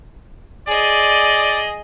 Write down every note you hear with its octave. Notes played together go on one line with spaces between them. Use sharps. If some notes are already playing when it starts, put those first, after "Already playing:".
G#4 D5 D#5